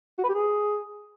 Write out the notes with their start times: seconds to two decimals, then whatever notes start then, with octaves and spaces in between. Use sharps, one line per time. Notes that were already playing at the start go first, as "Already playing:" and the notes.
0.18 F#4
0.24 B4
0.29 G4
0.34 G#4